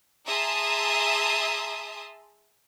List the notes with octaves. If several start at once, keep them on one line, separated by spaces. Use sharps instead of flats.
G#4 E5 A5 A#5 C6 D#6